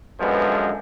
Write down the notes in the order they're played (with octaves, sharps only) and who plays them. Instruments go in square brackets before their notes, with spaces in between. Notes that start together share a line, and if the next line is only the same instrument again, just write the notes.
[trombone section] F#2 D3 F3 G#3 B3